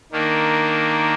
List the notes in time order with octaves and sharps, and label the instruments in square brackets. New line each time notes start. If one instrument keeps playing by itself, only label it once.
[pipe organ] D#3 A#3 D4